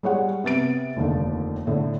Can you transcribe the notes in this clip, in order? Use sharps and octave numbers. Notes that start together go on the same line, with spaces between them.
G3 G#3 C#5 F#5
C3 B3 A6 D7
F1 D#2 D3 D#3
A2 D3